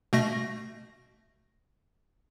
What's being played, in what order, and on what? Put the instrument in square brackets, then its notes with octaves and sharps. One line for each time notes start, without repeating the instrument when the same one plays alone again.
[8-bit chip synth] B2 A3 A#6